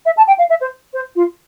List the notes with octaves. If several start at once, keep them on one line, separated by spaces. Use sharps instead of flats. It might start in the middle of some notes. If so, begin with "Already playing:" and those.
E5
A5
G5
F5
E5
C5
C5
F4